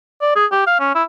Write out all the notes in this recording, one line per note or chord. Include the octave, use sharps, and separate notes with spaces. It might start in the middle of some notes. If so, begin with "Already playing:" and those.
D5
G#4
G4
F5
C#4
E4